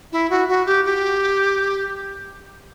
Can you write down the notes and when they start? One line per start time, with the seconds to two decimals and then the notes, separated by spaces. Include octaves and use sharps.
0.12 E4
0.30 F#4
0.48 F#4
0.66 G4
0.85 G4